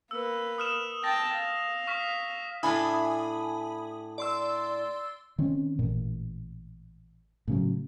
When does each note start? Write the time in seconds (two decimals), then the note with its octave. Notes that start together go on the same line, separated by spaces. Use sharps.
0.11 A#3 B4 E6
0.58 D#6 F6 E7
1.04 G5 A5 A#6
1.35 F5
1.87 C#6 F6 B6
2.63 A2 D4 E4 G#5 B5 D#6
4.18 D5 C6 E6
5.38 D#3 C4 C#4
5.79 A1 A#2
7.48 A2 C#3 F#3